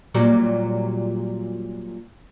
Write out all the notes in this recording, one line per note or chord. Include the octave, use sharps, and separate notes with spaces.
A#2 F#3 G3